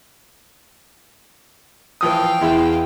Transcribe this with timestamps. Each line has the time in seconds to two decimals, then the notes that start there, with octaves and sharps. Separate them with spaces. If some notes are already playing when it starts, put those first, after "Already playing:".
2.01 E3 F3 F5 G5 D#6
2.41 E2 E4 C6